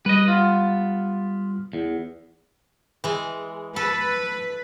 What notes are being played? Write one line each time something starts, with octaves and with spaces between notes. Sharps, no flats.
G3 B4 D#5
B3 F4
E2
E3 G#3
A4 B4